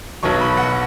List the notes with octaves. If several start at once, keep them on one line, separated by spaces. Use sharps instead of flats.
B1 B2 F#3 C#6
B5
F#5